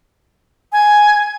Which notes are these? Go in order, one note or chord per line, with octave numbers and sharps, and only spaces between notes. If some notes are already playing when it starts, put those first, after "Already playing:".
G#5